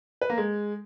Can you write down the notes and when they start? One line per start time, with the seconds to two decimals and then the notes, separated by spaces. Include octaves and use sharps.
0.22 B4
0.30 A#3
0.38 G#3